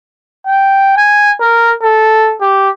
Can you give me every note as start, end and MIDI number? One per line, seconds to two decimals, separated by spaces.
0.47 0.95 79
0.97 1.33 80
1.41 1.71 70
1.82 2.36 69
2.41 2.69 67